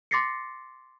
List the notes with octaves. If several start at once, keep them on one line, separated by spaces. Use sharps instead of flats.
C6 D6 A6 A#6 C7 C#7